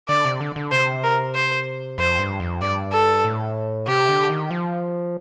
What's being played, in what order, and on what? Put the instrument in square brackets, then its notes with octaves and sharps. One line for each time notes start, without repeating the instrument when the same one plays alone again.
[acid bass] D3 [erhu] D5
[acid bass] C3
D3
D3
[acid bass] C3 [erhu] C5
[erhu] A#4
C5
[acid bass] F2 [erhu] C5
[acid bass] G2
F2
[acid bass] G2 [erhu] D5
[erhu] A4
[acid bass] A2
[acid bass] C3 [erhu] G4
[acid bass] D3
D#3
F3